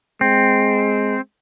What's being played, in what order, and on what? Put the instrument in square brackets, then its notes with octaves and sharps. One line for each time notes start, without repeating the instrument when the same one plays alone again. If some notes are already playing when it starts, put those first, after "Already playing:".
[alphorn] G#3 [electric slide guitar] C4